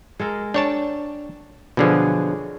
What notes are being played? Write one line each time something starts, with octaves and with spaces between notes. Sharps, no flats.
G#3 A4 A#4
D4 C#5 G5 A5
B2 D3 F3 F#3 D4 G#4